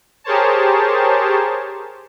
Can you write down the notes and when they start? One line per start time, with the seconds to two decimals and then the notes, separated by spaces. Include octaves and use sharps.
0.24 G4 G#4 A#4 C5 C#5 A5